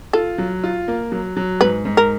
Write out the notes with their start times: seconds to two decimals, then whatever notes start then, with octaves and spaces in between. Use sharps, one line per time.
0.13 F4 A4
0.38 F#3
0.64 F4
0.88 A#3
1.12 F#3
1.37 F#3
1.61 G#2 B4
1.85 G#2
1.97 A#4